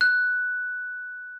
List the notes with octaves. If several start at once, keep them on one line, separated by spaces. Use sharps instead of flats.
F#6